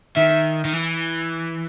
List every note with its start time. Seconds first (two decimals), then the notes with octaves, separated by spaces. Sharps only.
0.16 D#3 E5
0.65 D#3
0.73 E3